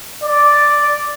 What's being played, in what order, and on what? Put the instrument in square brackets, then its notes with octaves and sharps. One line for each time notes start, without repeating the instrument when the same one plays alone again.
[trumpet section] D5